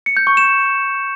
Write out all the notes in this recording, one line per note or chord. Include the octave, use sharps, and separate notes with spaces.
C#7
G6
C#6
E7